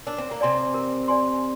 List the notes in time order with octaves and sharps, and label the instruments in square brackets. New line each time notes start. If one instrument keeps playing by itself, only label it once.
[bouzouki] D4 [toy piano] A#4
[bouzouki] C4
A#3
[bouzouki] C3 C4 [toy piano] D5 G#5 C6
[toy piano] A#4
D5 G#5 C6